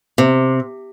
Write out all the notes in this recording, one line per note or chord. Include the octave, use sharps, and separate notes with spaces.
C3